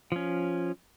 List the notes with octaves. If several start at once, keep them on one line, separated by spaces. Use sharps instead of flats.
F3 C#4